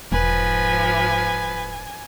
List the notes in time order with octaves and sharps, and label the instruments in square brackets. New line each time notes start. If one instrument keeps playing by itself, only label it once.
[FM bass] E1 [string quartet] G#2 F3 [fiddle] B4 [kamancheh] G#5